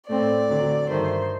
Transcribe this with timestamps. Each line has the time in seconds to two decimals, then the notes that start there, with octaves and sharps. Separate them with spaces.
0.08 A2 A3 C4 D5
0.49 D2 D3 F#3 C4
0.90 G2 D#3 A3 C5